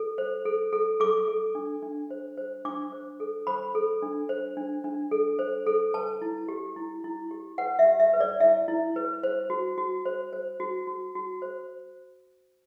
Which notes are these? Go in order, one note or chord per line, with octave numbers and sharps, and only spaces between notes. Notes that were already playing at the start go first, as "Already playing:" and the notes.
Already playing: A4
C5
A4
A4
A4 D6
A4
D4
D4
C5
C5
D4 D6
C5
A4
C5 B5
A4
D4
C5
D4
D4
A4
C5
A4
B4 A5
E4
G4
E4
E4
G4
B4 F#5
E5
G4
E5
B4
D5
E4 E5
E4
B4
C5
F#4
F#4
C5
C5
F#4
F#4
F#4
C5